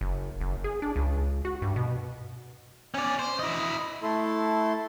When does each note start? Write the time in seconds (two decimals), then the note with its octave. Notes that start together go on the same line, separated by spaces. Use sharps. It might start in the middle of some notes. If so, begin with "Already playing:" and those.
0.01 F#1
0.41 F#1
0.64 G#4
0.82 D4
0.96 C#2
1.45 F#4
1.62 G2
1.76 B2
2.94 C#4 D5
3.19 C5
3.39 E4 D#5
4.03 A3 E4 A4 A5 C6